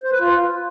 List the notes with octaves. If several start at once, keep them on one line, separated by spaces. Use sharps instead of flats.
C5
B4
F4